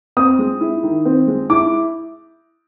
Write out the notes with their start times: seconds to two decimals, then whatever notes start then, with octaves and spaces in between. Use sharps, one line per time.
0.17 C4 D#6
0.39 G#3
0.61 E4
0.83 D#3
1.05 C4
1.27 G#3
1.50 E4 D6